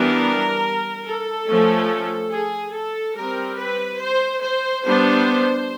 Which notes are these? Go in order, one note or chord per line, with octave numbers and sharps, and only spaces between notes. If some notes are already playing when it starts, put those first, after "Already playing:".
Already playing: E3 G3 B3 D4 A#4
A4
F3 A3 C#4
G#4
A4
G3 C4 A#4
B4
C5
C5
G3 B3 D4 C5